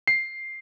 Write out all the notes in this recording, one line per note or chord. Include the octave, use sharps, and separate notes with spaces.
C7